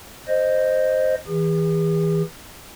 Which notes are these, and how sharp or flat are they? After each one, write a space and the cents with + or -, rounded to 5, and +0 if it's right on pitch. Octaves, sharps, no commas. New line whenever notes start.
C5 +0 D#5 -10
E3 -25 G#4 -45